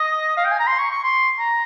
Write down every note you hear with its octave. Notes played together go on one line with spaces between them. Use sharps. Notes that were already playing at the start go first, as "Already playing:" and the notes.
Already playing: D#5
F5
G5
G#5
A#5
C6
C#6
C#6
C6
A#5